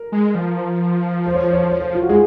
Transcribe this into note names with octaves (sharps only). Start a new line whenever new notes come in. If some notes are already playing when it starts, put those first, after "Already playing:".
Already playing: A#4
G#3
F3
C5
C#5
C5
C#5
C5
C#5
C5
F4
F#4
G#3 G#4